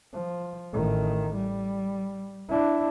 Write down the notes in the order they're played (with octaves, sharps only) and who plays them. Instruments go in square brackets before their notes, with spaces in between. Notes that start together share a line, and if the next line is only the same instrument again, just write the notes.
[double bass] F3
A1 D#3
G3
D4 E4